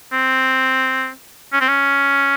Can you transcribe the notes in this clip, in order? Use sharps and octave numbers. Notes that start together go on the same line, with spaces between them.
C4
C#4
C4
C#4